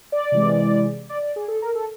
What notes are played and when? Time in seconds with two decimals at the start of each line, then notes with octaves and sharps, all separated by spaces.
0.12 D5
0.32 C3 E3 G#3
1.09 D5
1.22 D5
1.36 G#4
1.48 A4
1.62 A#4
1.75 A4